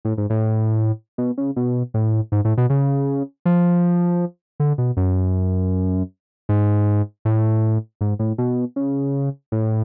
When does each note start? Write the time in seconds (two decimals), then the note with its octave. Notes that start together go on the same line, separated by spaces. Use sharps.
0.05 A2
0.18 G#2
0.30 A2
1.18 B2
1.38 C#3
1.56 B2
1.94 A2
2.32 G#2
2.45 A2
2.57 B2
2.70 C#3
3.45 F3
4.60 D3
4.78 B2
4.97 F#2
6.49 G#2
7.25 A2
8.01 G#2
8.19 A2
8.38 B2
8.76 C#3
9.52 A2